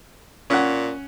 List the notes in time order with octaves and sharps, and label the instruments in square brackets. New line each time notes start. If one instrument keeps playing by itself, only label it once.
[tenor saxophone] A#2 [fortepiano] C#4 F#5